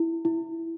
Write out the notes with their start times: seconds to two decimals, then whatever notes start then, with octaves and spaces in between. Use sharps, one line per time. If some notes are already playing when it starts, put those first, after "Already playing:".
Already playing: E4
0.25 E4